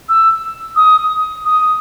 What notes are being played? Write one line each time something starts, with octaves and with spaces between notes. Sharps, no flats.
E6
D#6
D#6